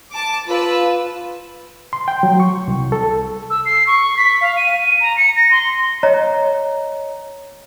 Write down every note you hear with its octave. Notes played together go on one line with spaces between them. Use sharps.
A5 D6
F4 B4 E6
C6
G5
F#3
C#6
C2
A4
E6
C7
C#6
B6
F5
D#7
A#5
C#7
A#6
C6
C#5 D#5 A#5